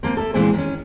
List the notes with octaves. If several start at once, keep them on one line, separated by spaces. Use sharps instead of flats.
F3 A#3 C4
A4 E5
A#2 E3 G#3 C4 G#4 C5
D#3 C#4